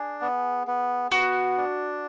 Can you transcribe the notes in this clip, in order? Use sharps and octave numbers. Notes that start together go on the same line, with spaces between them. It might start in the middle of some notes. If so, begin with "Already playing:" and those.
Already playing: D4 G#4
B3
B3
B3 F#4
D4